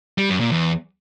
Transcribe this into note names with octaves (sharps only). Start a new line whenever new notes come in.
G3
F#2
A#2
E2